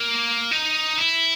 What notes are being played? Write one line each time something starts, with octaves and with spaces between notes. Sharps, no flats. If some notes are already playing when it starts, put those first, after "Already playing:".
Already playing: A#3
D#4
E4